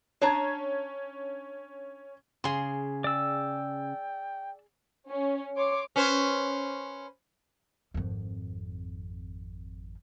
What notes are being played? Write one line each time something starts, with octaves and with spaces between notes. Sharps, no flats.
C#4 D4 A5 A#5 G#6
C#3 G#4 C6
D5 G5 E6
C#4
C#5 C6 D6
C#4 B4 C5
G#1 F2